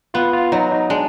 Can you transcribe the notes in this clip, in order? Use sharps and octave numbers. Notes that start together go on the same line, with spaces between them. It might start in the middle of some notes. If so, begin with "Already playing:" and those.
B3 F4
F4
F#3 D#4
D#4
G#3 D4